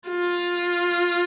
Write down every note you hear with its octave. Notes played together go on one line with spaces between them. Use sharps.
F4